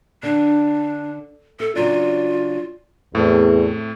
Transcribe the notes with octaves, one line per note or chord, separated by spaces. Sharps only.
D3 D4
A4 E5
C#3 F#3 D4 F4
E2 A2 A3 C4